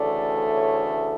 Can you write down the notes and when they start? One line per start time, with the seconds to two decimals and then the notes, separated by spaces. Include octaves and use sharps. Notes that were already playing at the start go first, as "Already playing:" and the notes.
Already playing: D2 C#3 E3 A3 D5
0.54 C#5